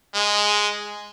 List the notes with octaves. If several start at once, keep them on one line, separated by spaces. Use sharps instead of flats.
G#3